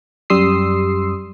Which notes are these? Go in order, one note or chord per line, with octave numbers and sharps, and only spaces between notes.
F#2 G3 C6 D#6 E6 C7